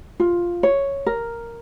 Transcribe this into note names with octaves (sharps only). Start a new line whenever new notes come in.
F4
C#5
A#4